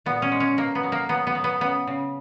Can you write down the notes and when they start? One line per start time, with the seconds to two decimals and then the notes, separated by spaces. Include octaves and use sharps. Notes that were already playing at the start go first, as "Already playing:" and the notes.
0.06 A#2 B3
0.22 C#4
0.32 G#3
0.40 C#4
0.57 B2 A#3
0.75 B3
0.83 F#3
0.92 A#3
1.09 F#3 B3
1.27 B3
1.35 F#3
1.44 B3
1.61 C#3 B3
1.87 C#3